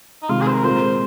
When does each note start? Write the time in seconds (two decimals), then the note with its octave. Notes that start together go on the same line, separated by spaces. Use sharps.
0.23 D#4
0.29 C3 D#3 G#3 F4
0.41 G#4
0.47 C5
0.52 A#4
0.64 A#2 G#3 C4 F4 A#4 C5